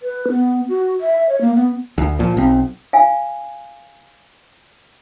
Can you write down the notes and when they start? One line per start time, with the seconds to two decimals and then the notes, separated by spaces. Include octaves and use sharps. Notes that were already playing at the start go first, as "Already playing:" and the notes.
0.02 B4
0.29 B3
0.69 F#4
1.00 E5
1.29 C#5
1.41 A#3
1.55 B3
1.98 D2
2.19 A#2 F3
2.37 B1 C4
2.93 F5 G#5